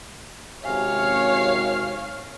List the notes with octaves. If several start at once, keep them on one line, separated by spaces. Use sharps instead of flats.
G#1 C3 C#4 C#5 F5